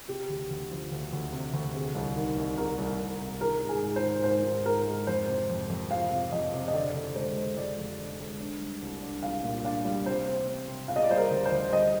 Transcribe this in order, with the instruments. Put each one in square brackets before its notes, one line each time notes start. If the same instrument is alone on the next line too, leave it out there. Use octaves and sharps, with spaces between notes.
[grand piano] C3 [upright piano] G4
[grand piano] D2
D2
F3
D2
D2
C3
D2
[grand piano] C3 [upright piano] G#4
[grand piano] C2
D#3
C2
[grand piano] C3 [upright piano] A#4
[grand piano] C2
C2
C3
[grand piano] D#3 [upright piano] A#4
[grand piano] G#2
[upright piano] G#4
[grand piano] G#2
[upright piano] C5
[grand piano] D#3
[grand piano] G#2 [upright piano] C5
[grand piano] G#2
[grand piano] G#2 [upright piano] A#4
[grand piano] G#3
[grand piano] F2 [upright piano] C5
[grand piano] C3
F2
F2
[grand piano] F3 [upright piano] F5
[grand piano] C3
[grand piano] F2 [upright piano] D#5
[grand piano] C3
[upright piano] D#5
[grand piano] D3 [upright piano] D5
[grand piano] D3
[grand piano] G#3 [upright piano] C5
[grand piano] G#3
[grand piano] G#3 [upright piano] D5
[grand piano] F1
D3
G#3
D4
G3
C2
D4
[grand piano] C2 [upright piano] F5
[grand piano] A#2
[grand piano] D4 [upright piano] F5
[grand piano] G3
[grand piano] C3 [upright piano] C5
[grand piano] C4
C4
C3
[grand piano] C3 [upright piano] F5
[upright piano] D#5
D5
[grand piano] G3 [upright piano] C5
[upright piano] A#4
[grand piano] D2
[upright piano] C5
[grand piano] D2
[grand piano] G3 [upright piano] D#5